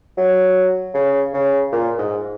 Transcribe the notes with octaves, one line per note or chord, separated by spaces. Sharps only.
F#3
C#3
C#3
A#2
G#2